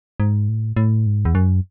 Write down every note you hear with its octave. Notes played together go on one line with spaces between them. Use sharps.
G#2
A2
A2
G#2
E2
F#2